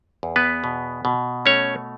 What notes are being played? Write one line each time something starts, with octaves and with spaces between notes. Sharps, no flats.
E2
B3 B4
B2
B2
A3 C#4 C#5